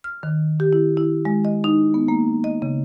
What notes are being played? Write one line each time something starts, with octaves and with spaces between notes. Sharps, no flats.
F6
D#3
G4
E4
E4
G#3
D#5
D#4
B3
A#3
D#5
C#3